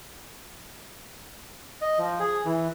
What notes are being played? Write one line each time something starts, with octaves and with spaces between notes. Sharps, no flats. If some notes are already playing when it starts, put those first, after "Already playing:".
D#5
F3
G#4
E3